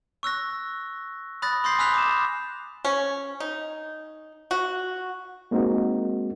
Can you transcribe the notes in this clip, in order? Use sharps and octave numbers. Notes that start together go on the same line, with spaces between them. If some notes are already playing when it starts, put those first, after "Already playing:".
C#6 E6 F#6 A#6
B5 D#6 F#6 A6 A#6
B5 C6 D#6 G6 A#6 C7
G#5 D#6 E6 F#6 B6 F7
D6 E7
C#4
D#4
F#4
G#3 A#3 C4 D#4 F#4